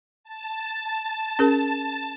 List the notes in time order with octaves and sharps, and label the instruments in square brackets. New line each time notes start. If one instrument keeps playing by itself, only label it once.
[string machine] A5
[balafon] C#4 G#4 A#4